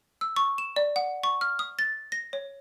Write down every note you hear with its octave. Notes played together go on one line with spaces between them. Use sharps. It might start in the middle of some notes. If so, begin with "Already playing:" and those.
E6
C#6
E7
D5
F#5
C#6
F6
D#6
A6
A#6
C#5